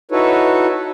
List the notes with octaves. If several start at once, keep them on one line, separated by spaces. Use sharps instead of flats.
D#4 E4 F#4 A4 B4 C#5